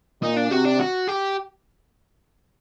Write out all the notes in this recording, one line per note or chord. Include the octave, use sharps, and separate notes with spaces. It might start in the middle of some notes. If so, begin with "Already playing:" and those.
A#2 D#4
D4
C3 F#4
D4
F#4
G4